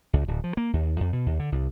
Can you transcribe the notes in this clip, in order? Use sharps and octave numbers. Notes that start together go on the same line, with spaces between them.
C#2
D1
F3
A#3
D#2
F2
B2
D#2
D3
C2